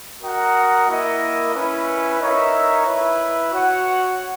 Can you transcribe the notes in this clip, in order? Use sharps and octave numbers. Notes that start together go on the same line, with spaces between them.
F#4 A#4 D#5 F#5
A#3 E4 A#4 D#5
C#4 E4 B4
D#4 A#4 C#5 E5
E4 B4 E5
F#4 C#5 F#5